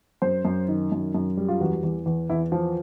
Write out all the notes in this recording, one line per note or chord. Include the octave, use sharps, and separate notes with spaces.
F#2 C5
F#2
D#3
F#2
F#2
G3
F4
E2 F#4
E2
E2
E2 E4
F3